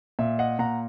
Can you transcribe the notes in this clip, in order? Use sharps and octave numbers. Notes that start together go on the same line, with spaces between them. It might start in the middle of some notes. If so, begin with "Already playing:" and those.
A#2 E5
D#5 F#5
A#2 F#5 A#5